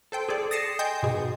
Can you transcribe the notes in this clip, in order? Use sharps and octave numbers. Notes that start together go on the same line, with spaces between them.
A4 C5 G5
G#4 A4 D5
D#6 A6 A#6 C7 C#7 E7
D#5 G5 G#5 C6 G6
G#2 B2 G#4